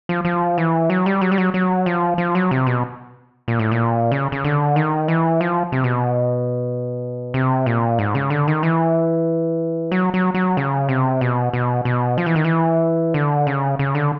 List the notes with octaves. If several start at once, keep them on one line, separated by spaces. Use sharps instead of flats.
F3
F3
E3
F#3
G3
F#3
G3
F#3
F#3
F3
F3
F#3
C3
B2
A#2
A2
A#2
C#3
C#3
D3
D#3
E3
F3
C3
B2
C3
A#2
G#2
C#3
D3
D#3
E3
F#3
F#3
F#3
C#3
C3
B2
B2
B2
F3
E3
D#3
E3
D3
C#3
C#3
D3